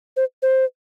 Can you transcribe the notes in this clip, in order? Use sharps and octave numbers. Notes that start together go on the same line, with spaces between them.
C5
C5